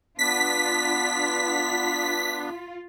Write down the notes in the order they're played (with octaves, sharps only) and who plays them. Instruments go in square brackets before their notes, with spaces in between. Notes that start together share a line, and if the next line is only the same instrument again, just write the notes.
[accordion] B3 D4 [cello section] F4 [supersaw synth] B6